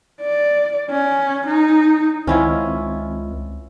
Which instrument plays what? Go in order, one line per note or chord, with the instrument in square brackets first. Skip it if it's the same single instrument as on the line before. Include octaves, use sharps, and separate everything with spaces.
[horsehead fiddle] D5
C#4
D#4
[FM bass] C#2 [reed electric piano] D#3 C4 [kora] C#4 E4 F4